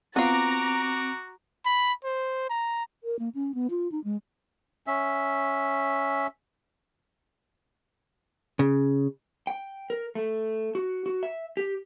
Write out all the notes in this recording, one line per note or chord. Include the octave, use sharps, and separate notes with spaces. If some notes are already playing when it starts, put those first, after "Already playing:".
B3 C4 F4 F#4 A#5 D6
B5
C5
A#5
A#4
A#3
C#4
B3
F4
D#4
G#3
C#4 E5
C#3
G5
A#4
A3
F#4
F#4
E5
G4